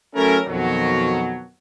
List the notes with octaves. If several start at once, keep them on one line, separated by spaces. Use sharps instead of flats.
F#3 A3 C#4 E4 A4 A#4
F2 B2 D#3 F#3